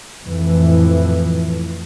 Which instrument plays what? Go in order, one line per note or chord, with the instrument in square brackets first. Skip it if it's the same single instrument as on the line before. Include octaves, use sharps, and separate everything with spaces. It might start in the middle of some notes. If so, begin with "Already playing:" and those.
[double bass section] F2 A2 E3